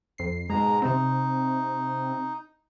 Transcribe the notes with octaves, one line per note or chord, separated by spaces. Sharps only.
F2 C7
G#2 B2 G#3 A#5
C3 C4 D#4